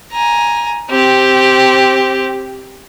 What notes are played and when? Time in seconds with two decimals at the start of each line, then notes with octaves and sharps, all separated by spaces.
0.12 G#5 A#5
0.90 C4 G4